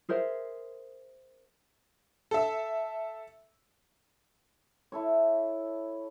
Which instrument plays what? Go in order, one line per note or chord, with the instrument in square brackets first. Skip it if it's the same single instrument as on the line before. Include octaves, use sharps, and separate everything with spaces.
[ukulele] G#4 A#4 C5 E5
[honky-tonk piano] A4 E5
[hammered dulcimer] E4 A4 C#5